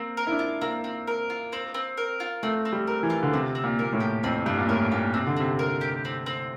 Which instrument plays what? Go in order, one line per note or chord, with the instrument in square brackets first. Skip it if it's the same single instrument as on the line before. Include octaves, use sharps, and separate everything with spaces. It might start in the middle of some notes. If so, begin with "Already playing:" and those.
Already playing: [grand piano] A#3 [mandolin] C4
[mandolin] A#4
[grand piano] E4
D4
[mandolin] F4
[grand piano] A#3 [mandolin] C4
[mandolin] C4
A#4
F4
C4
C4
A#4
F4
[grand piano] A3 [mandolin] C4
[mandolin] C4
[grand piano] G3
[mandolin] A#4
[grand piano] E3
[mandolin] F4
[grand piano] D3
[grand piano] C3 [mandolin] C4
[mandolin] C4
[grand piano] A#2
[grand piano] A#2 [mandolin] A#4
[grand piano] A2
[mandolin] G4
[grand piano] F2 [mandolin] C4
[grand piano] G2 [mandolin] C4
[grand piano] A#2
[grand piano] A2 [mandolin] A#4
[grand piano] A#2 [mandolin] G4
[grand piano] C3 [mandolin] C4
[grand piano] D3
[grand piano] C3 [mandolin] C4
[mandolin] A#4
G4
C4
C4